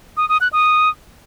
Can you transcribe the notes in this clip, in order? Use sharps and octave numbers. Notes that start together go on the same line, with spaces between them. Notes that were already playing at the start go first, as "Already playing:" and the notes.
D#6
D#6
F#6
D#6